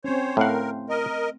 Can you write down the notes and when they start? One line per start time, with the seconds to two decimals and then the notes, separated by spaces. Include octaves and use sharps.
0.04 C4 C#4 C5 C#5
0.37 A2 A3 C4 A#4 F5 F#5
0.89 A#4 D#5